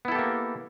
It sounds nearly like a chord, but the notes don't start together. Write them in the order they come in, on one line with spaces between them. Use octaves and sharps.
B3 E4 A4 G4 A#3